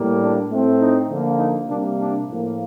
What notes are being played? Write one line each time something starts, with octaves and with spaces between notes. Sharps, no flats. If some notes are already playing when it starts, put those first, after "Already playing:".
Already playing: A2 G3 A#3
D4
A2 A3 C4
D#4
D3 F3 A#3
D#4
C3 G3 A#3 D4
D4
A2 F3 A#3